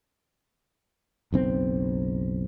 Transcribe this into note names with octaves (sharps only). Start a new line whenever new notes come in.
F#1 B1 C4